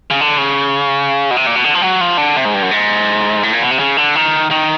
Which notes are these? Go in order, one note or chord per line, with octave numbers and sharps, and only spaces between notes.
C#3
D3
C#3
B2
C3
A#2
B2
D3
F3
F#3
F3
D3
C3
G#2
G2
F#2
G#2
A2
A#2
B2
C3
C#3
D3
D#3
D#3